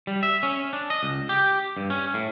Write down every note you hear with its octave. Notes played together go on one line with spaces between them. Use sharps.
G3
E5
C#4
D4
D#5
C#2
G4
G2
C#4
A2